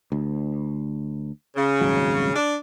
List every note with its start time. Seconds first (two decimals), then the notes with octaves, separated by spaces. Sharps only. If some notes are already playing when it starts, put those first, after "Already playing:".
0.12 D2
1.56 C#3
1.81 D#1 G#1 F#3
2.36 D4